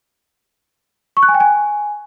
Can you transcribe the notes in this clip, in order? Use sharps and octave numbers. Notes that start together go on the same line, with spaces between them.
C#6
F#6
G#5
G5
G#5